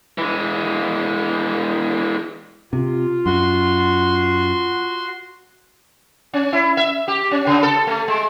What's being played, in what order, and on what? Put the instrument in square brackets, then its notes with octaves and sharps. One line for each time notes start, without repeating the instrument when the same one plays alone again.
[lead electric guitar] E3 G#3
[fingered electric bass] C3 [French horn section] F4
[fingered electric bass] F#2 [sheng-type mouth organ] F#4 C6
[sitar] C#4
E4
E5
G4
C#4
C#3
A4
A3
G#3